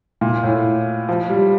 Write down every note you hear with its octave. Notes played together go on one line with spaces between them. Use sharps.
A#2
A2
F3
G3